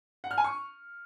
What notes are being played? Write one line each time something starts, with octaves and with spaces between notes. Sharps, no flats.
F#5
F6
G#5
C#6